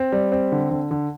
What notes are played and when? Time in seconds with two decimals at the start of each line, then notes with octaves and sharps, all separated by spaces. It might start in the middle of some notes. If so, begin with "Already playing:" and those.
Already playing: C4
0.12 G3
0.32 C4
0.52 D3
0.71 D3
0.91 D3